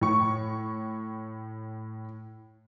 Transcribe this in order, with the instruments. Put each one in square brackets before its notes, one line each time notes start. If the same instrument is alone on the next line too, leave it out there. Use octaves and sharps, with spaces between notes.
[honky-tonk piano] A2 C#6